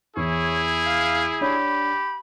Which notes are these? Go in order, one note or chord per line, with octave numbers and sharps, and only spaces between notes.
E2 E4 G#4 C#5
F5
D4 G4 C#5 D5 B5